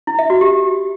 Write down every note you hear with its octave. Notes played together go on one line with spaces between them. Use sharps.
E4
E5
F#4
G4